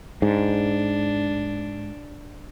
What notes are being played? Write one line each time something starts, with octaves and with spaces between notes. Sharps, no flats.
G#2 D4